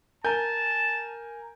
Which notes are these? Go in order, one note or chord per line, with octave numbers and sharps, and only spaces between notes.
A#4 G#5 A5 G6